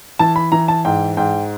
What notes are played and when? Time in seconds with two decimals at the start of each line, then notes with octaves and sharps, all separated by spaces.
0.19 E3 A5
0.36 B5
0.52 E3 A#5
0.68 A5
0.85 G#2 G5
1.17 G#2 G5